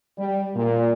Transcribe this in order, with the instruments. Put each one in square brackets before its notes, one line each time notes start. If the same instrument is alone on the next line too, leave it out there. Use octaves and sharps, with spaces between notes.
[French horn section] G3
A#2